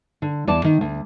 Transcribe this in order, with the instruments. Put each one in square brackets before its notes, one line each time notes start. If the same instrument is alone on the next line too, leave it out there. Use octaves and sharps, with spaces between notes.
[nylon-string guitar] D3
E2 D5 A5
D#3
D2